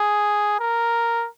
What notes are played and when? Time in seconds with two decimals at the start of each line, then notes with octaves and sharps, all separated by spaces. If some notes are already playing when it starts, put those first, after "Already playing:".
Already playing: G#4
0.59 A#4